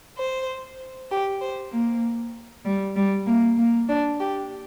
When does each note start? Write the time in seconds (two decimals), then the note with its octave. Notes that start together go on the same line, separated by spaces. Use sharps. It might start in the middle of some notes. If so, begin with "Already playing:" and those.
0.19 C5
1.11 G4
1.42 C5
1.72 A#3
2.65 G3
2.96 G3
3.27 A#3
3.58 A#3
3.88 D4
4.20 G4